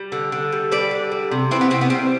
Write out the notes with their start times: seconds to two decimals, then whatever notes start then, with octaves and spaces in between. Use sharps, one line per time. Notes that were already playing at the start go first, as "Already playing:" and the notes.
Already playing: G3
0.12 D3
0.32 D3
0.52 G3
0.72 G3 B4 D5
0.91 D3
1.12 G3
1.31 C3
1.51 E3 C4 E4
1.61 B3
1.70 C3 C4
1.81 B3
1.90 G3 C4